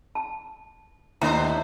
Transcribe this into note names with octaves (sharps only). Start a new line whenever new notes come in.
A5
D#2 B3 D4 E4 C5 A#5